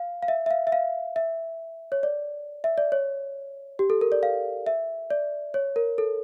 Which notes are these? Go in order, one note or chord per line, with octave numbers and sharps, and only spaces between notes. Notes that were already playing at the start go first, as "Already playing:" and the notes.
Already playing: F5
F5
E5
E5
F5
E5
F5
E5
C#5
D5
E5
D5
C#5
G4
A4
A#4
D5
F5
E5
D5
C#5
A#4
A4